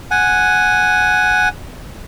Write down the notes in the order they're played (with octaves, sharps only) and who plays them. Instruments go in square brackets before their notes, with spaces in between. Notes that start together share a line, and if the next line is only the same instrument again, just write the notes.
[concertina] F#5 G#5